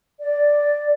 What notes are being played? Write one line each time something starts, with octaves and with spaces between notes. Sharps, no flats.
D5